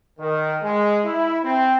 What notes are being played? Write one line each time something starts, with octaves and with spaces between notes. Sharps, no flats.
D#3
G#3
E4
C4